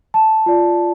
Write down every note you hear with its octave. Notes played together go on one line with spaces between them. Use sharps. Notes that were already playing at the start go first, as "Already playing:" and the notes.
A5
F4 D5